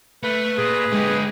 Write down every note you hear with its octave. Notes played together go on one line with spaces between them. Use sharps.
A3 B4
A#2 G#4
D3 G#3 G4